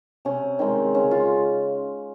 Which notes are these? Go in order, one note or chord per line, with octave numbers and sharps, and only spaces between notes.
C3 C#4
D#3 G#3 C4
C#3 C#4
F4